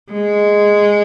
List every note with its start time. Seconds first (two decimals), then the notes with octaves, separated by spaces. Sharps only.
0.12 G#3